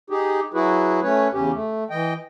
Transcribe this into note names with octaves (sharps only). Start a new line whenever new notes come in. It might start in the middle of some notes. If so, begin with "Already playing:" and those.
D#4 G4 G#4
F#3 E4 F#4 G#4 B4
A3 C#4 B4 C#5
E2 C#3 C#4 G4
A3
E3 D#5 G5